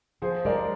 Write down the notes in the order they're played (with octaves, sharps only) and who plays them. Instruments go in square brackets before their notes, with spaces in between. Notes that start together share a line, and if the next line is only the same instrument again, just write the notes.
[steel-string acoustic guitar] F3 [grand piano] G#4 C5
[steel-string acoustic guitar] G#3 [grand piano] A#4 D5